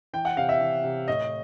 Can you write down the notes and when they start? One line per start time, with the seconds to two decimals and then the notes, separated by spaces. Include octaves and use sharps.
0.13 E3 G5
0.25 F#5
0.37 C3 F5
0.49 E5
0.60 E3
0.84 C3
1.08 A2 D#5